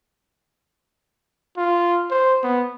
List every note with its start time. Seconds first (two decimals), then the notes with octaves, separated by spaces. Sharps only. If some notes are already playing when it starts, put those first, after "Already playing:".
1.57 F4
2.11 C5
2.43 B3